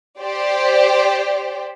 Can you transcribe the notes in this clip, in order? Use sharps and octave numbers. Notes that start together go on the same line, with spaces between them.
G4 C5 D5